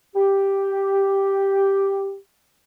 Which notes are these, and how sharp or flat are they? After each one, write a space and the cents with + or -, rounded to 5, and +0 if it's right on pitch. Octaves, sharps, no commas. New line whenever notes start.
G4 +0